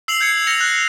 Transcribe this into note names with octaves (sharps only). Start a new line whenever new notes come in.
E6 C7 F7 F#7
G6 G#6 C#7
F6 A#6 C#7 F7
F#6